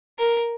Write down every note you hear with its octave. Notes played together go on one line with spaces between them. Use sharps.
A#4